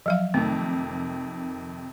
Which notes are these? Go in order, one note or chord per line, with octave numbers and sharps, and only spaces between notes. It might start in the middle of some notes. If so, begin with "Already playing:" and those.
F3 F#3 F5
F2 C3 D#3 A3